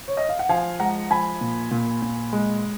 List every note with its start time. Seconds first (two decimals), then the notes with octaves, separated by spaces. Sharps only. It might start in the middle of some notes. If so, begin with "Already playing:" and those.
0.08 C#5
0.17 D#5
0.29 F5
0.39 F#5
0.49 F3 F5 G#5
0.80 G#3 F#5 A#5
1.11 F3 G#5 B5
1.41 A#2
1.71 A#2
2.02 A#2
2.33 G#3